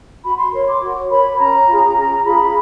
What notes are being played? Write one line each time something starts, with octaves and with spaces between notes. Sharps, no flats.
F#4 B5
C6
A#4 C#5 C6
D6
F#4
A#4 C#5 B5
C#4 A#5
F4 G#4
C#4 A#5
F4 G#4 B5